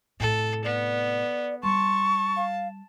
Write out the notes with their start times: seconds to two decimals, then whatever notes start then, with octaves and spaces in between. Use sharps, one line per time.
0.20 A2 C3 A4
0.65 B3 D5
1.63 G3 A5 C6 C#6
2.36 F5